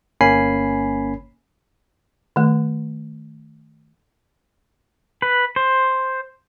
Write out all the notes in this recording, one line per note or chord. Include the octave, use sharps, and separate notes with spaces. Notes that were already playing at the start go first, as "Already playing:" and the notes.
G1 A#3 C#4 G#5 B5 C7
D#3 A3
B4
C5